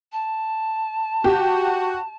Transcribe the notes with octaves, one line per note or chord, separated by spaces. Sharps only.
A5
F#4 G4